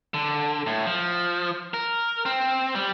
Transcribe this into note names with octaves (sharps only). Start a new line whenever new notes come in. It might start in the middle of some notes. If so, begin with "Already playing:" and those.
D3
A2
F3
A#4
C4
G3